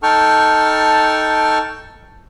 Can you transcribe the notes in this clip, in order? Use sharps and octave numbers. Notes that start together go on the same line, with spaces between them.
D#4 A4 G5 A5 C#6 F6